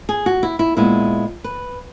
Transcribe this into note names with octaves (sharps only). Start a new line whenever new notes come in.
G#4
F#4
E4
E4
A#2 G#3 B3 E4
B4